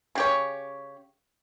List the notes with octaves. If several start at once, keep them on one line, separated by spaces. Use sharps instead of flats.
C#3 G4 C#5